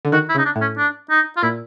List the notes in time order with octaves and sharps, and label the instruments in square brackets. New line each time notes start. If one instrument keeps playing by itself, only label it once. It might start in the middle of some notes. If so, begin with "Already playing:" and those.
[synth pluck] D3
[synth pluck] D#3 [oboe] F#4
[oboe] E4
[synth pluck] C#3
[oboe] D#4
D4
[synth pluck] A2
[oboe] C#4
D4
D#4
F4
[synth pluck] A#2 [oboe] E4